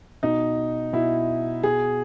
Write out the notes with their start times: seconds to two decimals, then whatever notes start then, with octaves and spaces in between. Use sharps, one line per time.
0.23 B2 D#4
0.93 B2 E4
1.63 B2 G#4